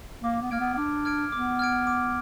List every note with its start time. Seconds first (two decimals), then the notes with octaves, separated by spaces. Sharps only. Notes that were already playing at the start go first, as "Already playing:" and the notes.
0.23 A#3 D6
0.42 B3
0.51 A#3 F6 G#6 D7
0.60 B3
0.74 B3
0.77 D4 D6
1.05 F6 G#6 D7
1.32 B3 D6
1.59 F6 G#6 D7
1.87 D6